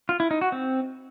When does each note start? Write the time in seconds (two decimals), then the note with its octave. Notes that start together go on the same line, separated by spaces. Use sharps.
0.09 F4
0.20 E4
0.31 D#4
0.41 F#4
0.52 C4